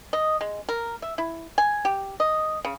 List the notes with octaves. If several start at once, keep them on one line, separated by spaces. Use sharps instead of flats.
D#5
G#3
A#4
E5
E4
G#5
G4
D#5
C#3